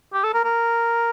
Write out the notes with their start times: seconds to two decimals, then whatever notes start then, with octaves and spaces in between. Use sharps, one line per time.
0.13 G4
0.24 A4
0.34 A#4
0.45 A#4